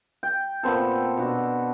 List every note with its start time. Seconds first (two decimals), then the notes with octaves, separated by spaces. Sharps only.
0.23 G5
0.63 A#2 B3 C4 A4
1.17 B2 D4 F#4